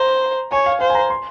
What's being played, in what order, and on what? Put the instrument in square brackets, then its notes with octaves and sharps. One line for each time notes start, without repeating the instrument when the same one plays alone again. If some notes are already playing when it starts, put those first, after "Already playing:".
Already playing: [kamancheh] C5 [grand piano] A#5
[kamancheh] C#5 [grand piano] G#5
[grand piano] F5
[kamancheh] C5 [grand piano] F5
[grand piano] G#5
A#5
C6